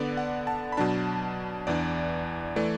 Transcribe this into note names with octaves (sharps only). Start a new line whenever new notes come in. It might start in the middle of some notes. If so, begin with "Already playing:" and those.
Already playing: D3 B3 D4 D5
F#5
A5
B5
B2 F#3 D4 A5
E2 E3 D4 D5
E3 A3 D5